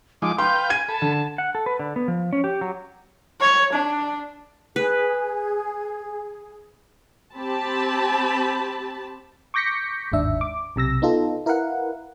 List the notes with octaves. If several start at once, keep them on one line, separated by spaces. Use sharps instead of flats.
F3 G#3 D#4 D6
B4 F5 G5 C6 G6
G#5 G#6 D#7
A4 A5 B5
D3
F#5
A4
B4
D3
B3
F3
C#4
G4
F#3
C#5
D4
G#4 B4
C4 G4 A5 B5
C#6 D6 G6 A#6 B6 C#7
G1 D#2 G#2 D4 E5
D6
B1 C3 E6 A#6
B3 D#4 F4 A4
E4 A#4 B4 F5 F#5